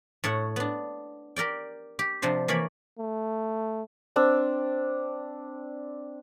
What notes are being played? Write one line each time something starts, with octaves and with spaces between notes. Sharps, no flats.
A2 A4 C#5 F#5
B3 D4
G4 A#4 D5 G5
G4
C3 F3 D4 C5
E3 A#3 C#5 D5 B5
A3
C4 D4 E6